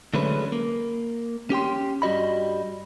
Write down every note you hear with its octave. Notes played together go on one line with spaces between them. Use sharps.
D3 F#3 G#3 A3 C#4 B4
A#3
C#4 G4 G5 C6
G2 G3 F#4 D#5 B5